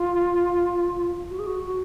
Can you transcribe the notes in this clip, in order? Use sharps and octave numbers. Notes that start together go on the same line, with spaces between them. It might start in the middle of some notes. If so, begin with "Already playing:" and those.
Already playing: F4
F#4
G#4
F#4
F#4